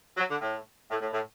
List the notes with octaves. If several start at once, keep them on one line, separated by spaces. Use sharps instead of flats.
F#3
D3
A2
A2
A2
A2